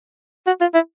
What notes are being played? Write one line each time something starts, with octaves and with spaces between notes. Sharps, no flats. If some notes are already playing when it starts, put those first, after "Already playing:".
F#4
F4
E4